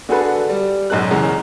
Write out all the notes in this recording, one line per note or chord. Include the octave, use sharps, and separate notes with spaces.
D3 F#4 G#4 A4 B4
G3
B1 F#2 G#3 F#6
F#1 E2 C#3 A#5